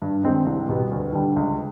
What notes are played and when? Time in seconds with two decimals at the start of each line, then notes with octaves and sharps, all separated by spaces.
0.02 G2
0.23 D#3 G#3 C4 D#4
0.46 C2
0.68 B2 G3 B3
0.91 D2
1.13 D3 G3
1.36 C#2